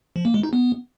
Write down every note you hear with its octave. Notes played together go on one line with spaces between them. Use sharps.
F3
A#3
G#3
D#4
B3